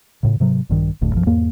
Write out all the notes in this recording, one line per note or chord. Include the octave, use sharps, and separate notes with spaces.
A2 C#3
G#2 C3 F#3
A#1 G2 D#3
F#1 D2 A2
B1 F#2 F3
E2 G#2 A#3